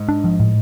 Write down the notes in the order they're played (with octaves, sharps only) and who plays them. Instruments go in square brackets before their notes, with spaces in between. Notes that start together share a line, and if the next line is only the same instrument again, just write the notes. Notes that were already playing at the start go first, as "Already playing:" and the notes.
Already playing: [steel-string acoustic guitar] G#2
[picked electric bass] D4
F3
A2